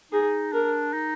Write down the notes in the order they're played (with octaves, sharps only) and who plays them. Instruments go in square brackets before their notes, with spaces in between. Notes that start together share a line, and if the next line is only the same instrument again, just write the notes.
[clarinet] D#4 [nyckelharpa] G#4
[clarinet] D4 [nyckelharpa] A#4
[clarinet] D#4